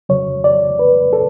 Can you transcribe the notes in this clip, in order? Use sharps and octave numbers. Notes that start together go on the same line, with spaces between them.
F2 C#3 F#3 C#5
D5
B4
A4